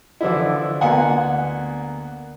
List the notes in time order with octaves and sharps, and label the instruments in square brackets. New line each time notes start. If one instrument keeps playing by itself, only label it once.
[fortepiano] D3 E3 F3 D4 E4
D2 A#3 B3 F#5 G#5